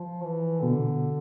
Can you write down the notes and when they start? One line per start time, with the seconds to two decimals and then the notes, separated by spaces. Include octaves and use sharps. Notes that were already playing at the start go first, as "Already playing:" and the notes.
Already playing: F3
0.24 E3
0.62 B2 D3